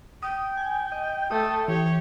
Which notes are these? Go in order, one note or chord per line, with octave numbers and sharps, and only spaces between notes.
G5 D#6
G#5
D#5
A3 D#6
E3 G4 C#5